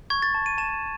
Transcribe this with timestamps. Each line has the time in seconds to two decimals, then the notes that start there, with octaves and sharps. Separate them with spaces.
0.10 C#6 G#6
0.22 A6
0.34 A5
0.46 D#7
0.58 A5 E7